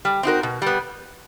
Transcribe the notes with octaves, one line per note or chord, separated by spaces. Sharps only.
G3
C4 D#4 F#4 A#4
B2
G3 B3